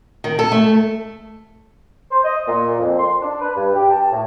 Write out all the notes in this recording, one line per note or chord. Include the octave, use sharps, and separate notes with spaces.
D#3
A4
A3
C5
D#5
A#2
F2
C6
D4
B4
G2
G4
A5
A2